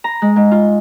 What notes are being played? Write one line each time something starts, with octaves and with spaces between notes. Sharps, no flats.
A#5
G#3
G#2
F4